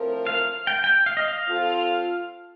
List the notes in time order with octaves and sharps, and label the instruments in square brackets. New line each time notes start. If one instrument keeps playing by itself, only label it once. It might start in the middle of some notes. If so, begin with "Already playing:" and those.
Already playing: [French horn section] A2 F3 C4 F4 A#4
[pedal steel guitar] F5
G5
G5
F5
D#5
F5
[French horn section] F3 C4 F4 A4